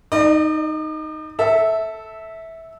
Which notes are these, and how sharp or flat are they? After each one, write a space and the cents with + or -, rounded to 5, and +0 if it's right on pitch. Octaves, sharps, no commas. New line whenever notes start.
D#4 +0 D5 +45
A4 +0 E5 -15